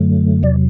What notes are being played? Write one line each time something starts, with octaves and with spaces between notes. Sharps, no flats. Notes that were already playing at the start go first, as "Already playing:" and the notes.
Already playing: F#2 D3 F#3 A3
E2 C3 F#3 D5